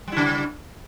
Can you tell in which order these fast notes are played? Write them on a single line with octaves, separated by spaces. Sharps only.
G3 E4 C#3